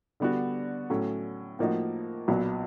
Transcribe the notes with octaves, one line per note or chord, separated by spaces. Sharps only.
D3 G3 B3 D4 F#4
A2 F#3 A3 C#4
A2 F3 A#3 D#4 F#4
B1 A#2 F#3 B3